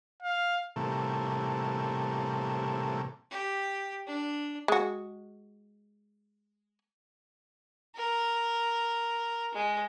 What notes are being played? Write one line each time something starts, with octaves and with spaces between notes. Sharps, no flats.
F5
A2 C3 E3 G3 A3 A#3
G4
D4
G#3 F#4
A#4
G#3